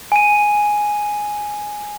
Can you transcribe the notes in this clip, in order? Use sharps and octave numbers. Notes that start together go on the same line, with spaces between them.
G#5 D#7